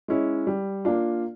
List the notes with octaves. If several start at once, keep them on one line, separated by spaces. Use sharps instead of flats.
G#3 C#4 E4
G3
A#3 D4 F4